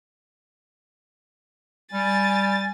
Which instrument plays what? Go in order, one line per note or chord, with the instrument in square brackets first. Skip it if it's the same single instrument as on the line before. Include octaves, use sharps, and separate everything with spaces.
[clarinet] G3 [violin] G#5 A6